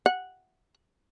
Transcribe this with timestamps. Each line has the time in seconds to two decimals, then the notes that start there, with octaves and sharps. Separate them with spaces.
0.06 F#5